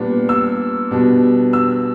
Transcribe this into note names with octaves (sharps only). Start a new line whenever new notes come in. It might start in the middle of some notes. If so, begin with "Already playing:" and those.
Already playing: A#2 G3 B3 D4
E6
B2 G3 B3 D4
E6